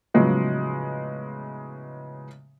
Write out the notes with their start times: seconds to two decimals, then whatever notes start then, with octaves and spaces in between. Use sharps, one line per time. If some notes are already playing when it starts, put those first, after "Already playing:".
0.14 A2 C#3 F3 F#3 G#3 B3